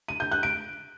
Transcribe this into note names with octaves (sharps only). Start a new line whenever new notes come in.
D#7
G6
F#6
D7